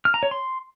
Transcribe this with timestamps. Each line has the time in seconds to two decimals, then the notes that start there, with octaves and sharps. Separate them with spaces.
0.05 F6
0.14 A#5
0.23 C#5
0.31 C6